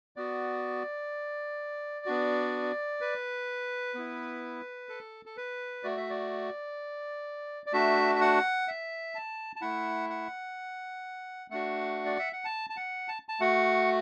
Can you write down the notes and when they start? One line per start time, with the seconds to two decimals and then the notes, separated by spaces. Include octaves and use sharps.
0.16 B3 F#4 D5
2.06 B3 D4 F#4
3.01 B4
3.94 B3 E4
4.89 A4
5.26 A4
5.37 B4
5.83 A3 F#4 D5
5.97 E5
6.10 D5
7.66 D5
7.73 A3 D4 F#4 E5
8.15 E5
8.21 F#5
8.68 E5
9.15 A5
9.56 A5
9.61 A3 E4 F#5
10.10 F#5
11.50 A3 D4 F#4 F#5
12.05 D5
12.19 E5
12.33 F#5
12.45 A5
12.70 A5
12.77 F#5
13.08 A5
13.29 A5
13.40 A3 F#4 F#5